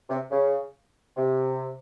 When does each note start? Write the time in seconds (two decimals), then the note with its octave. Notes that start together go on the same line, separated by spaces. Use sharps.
0.09 C3
0.31 C#3
1.16 C3